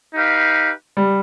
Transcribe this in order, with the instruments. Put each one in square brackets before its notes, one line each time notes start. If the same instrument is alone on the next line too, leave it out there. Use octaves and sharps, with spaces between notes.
[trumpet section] D#4 G4 B4 F5
[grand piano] G3